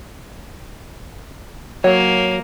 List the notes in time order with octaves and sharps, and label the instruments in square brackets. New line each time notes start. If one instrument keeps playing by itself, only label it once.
[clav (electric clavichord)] F#3 [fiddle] A#3 [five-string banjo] C#5